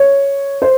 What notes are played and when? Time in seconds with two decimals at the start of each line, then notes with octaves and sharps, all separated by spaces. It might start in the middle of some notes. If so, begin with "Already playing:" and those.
Already playing: C#5
0.62 C5